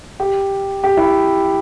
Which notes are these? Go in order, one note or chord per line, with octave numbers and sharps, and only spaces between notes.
G4
G4
E4